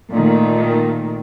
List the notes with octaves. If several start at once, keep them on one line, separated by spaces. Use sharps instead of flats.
A#2 D#3 A3